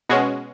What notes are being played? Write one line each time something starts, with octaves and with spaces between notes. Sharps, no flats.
B2 G#3 C#4 F#4